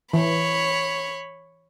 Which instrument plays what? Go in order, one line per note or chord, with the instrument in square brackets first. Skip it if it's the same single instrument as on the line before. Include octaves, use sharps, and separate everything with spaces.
[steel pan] E3 [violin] C#5 B5